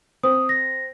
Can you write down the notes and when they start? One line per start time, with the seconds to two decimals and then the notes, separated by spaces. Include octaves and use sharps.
0.23 C4 D#6
0.49 A#6